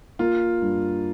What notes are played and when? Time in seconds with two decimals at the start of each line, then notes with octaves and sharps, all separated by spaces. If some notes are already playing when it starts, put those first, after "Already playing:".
0.19 A#3 F4
0.62 G2